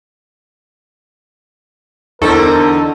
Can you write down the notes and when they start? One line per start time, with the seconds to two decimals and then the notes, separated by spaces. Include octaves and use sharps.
2.22 E2 D3 C4 D#4 A4 A#4 C#6